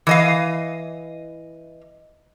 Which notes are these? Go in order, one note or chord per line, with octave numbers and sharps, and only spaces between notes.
E3 D#5 F5